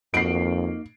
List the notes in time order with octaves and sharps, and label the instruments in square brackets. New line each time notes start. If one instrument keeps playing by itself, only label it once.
[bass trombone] F2 [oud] A#3 D#4 F#4 [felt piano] C7 D7